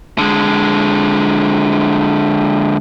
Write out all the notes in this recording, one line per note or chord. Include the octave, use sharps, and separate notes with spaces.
D3 G#3